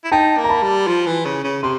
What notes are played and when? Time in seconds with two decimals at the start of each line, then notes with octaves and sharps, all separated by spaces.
0.04 E4
0.12 D#4 G5 A5
0.37 A#3
0.44 A#5
0.49 A5 B5
0.63 G3
0.87 F3
1.06 E3
1.25 C#3
1.44 C#3
1.63 C3 C6